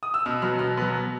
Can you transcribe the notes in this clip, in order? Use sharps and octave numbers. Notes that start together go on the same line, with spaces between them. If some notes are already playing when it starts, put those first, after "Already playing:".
D#6
E6
B2 F6
F#3 B3 F6
B2 F6
F#3 B3